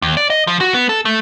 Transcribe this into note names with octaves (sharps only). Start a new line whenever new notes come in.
D#2
D5
D#5
F3
F#4
B3
A4
A3